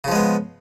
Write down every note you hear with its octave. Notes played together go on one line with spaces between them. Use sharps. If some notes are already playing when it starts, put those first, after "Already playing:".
C#3 F3 G#3 B3